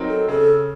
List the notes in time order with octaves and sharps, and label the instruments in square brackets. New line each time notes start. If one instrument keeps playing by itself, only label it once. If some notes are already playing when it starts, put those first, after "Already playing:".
Already playing: [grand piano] F#3 C4 D#4 A#4
[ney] A4
[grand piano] C#3 [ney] A4